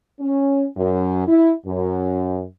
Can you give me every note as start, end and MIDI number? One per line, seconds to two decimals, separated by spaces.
0.21 0.65 61
0.77 1.23 42
1.27 1.53 64
1.66 2.43 42